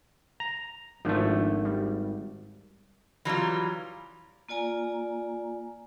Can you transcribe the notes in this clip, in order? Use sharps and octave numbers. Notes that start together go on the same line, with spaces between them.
A#5
G#1 F3 A3 D4
G3
E3 F#3 G3 F4
A#3 F4 D5 G#5 A#5